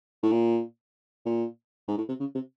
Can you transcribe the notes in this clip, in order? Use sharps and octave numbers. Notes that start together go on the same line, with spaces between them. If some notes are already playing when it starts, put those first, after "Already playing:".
A2
A#2
A#2
G#2
A2
C3
C#3
C3